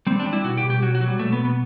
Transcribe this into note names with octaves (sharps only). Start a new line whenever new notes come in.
G3 C4
D4
G3
E4
B2 F#4
G4
B2
G4
F#3 F#4
F#4
F#3
G3
B2 A3
B3
B2
B3